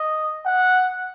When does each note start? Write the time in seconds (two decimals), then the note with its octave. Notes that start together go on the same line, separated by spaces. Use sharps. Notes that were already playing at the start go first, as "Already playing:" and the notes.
Already playing: D#5
0.46 F#5